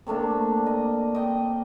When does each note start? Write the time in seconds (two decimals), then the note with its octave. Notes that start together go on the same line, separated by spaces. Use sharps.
0.07 C3 A3 A#3 D4
0.66 D#5
1.15 D#5 G5